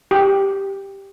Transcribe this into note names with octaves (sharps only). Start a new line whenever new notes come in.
G4